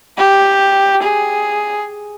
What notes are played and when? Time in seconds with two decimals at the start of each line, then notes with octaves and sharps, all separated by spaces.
0.18 G4
1.03 G#4